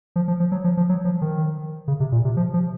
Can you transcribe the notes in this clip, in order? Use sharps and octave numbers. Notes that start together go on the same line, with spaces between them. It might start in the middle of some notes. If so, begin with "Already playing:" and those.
F3
F3
F3
F#3
F3
F3
F#3
F3
D#3
C#3
C3
A#2
C3
F3
F3